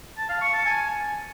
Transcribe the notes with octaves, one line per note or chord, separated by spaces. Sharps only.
A5
F5
C#6
A5
G#5